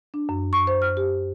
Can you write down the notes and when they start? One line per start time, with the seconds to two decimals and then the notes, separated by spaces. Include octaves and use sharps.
0.14 D4
0.29 F#2
0.53 C#6
0.67 C5
0.82 F6
0.97 G4